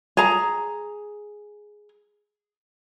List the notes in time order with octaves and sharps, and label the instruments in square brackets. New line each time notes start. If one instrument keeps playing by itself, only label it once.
[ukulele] G#4 A#5